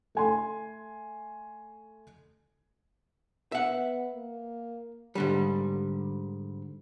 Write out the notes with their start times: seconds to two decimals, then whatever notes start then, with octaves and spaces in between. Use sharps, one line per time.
0.15 A3 G#5 C6
3.52 B3 E5 F#5
4.14 A#3
5.15 G#2 D3 G3